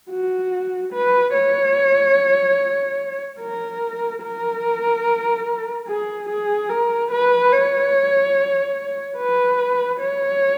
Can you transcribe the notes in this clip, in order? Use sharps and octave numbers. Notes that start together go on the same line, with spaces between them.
F#4
B4
C#5
A#4
A#4
G#4
G#4
A#4
B4
C#5
B4
C#5